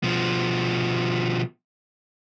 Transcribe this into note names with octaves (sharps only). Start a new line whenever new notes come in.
B2 F3